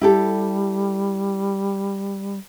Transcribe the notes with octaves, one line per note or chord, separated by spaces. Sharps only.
G3 E4 G4 A4